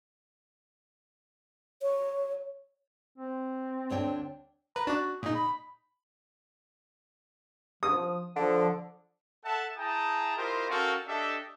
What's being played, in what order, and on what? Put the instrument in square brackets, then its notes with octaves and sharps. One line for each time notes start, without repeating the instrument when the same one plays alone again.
[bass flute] C#5
[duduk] C4
[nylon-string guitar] D2 D4 G5 [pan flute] C#5
[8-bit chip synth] B4 [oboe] A#5
[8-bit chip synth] D4 D5 [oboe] F#4
[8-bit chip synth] A#2 D#4 [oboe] G#4
[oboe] B5
[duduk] F3 [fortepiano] D#6
[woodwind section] D3 [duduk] F3
[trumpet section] A4 E5 F#5 A5
E4 G#4 G5 A5 A#5 D#6
E4 F4 G4 A#4 C5 D#5
C#4 F#4 A4 A#4 F5 G5
D4 G4 A4 D#5 E5